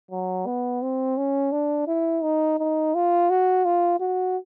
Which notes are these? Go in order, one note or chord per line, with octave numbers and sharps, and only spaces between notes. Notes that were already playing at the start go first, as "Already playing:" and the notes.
F#3
B3
C4
C#4
D4
E4
D#4
D#4
F4
F#4
F4
F#4